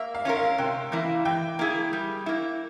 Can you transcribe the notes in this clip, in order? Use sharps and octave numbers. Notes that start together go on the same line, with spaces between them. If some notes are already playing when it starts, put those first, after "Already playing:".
Already playing: A#3 E5
F5
C#4 F4 A#4
F5
C3 G5
E3 A#3 E4
E3 G5
A#3 E4 G#4
G3
A#3 E4